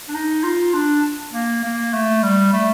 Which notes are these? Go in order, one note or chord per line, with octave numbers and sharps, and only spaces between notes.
D4
D#4
F4
D4
A#3
A#3
A3
G3
A3